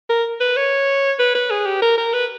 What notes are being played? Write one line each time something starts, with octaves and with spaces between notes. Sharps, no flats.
A#4
B4
C#5
B4
B4
G#4
G4
A#4
A#4
B4